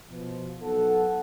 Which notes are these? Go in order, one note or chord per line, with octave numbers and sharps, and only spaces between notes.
B2 F3
B1 A4 F#5